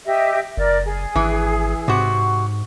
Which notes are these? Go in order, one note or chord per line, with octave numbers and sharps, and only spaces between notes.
G4 D#5 E5
F#1 A#4 D5
G#4
G#1 E3
G#2 C3 F#4